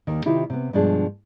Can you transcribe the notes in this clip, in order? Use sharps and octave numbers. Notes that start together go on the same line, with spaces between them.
D#2 D#3
C3 D#3 E4 F4 G4
C3 B3
G2 B2 F3 G#3 D4 G#4